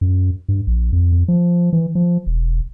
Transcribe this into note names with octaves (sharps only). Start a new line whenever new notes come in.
F#2
G2
A#1
F2
F2
F3
E3
F3
E1